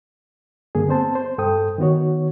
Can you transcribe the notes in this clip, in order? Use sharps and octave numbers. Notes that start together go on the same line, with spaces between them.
G2 D3 A#3 G#4
B3 C4 C5 A5
C5
G2 A4 G5 D#6
D#3 B3 F#4 C#5